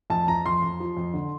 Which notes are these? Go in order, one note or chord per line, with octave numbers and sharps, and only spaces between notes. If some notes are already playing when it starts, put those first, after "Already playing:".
F2 A5
F2 A#5
F2 C6
F2
F3
F2
D3